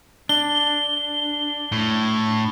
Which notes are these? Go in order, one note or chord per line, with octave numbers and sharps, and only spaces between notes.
D4 G7
A2